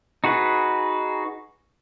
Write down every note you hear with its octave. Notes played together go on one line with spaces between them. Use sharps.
D#4 F#4 G#4 B4